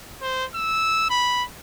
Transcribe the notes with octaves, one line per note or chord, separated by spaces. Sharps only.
C5
E6
B5